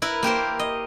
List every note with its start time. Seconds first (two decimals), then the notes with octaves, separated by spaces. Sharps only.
0.02 E4 A#4 B4
0.23 A#3 G4 A#4 C5
0.59 D#5